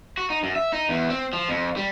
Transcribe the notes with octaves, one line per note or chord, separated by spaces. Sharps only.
F#4
D#4
F#2
E5
D#4
E2
C4
F3
F2
G3